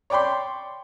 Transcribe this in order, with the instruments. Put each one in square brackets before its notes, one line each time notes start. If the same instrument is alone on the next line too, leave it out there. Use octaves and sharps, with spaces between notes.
[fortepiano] C#5 D5 G5 B5 C6